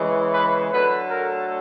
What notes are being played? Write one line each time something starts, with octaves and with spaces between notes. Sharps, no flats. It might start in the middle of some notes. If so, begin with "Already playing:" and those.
Already playing: C#3 E3 G#3
B4
D3 F#3 A3 B4
A#4